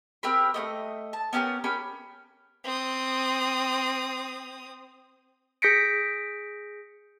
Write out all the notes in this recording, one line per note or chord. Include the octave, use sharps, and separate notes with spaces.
C4 G4 A#4 B5
A3 B3 D#5
A5
B3 C#4 G4 A#4
C#4 G4 A#4 B5
C4 D#6
G#4 G6 A#6 B6 C#7 D7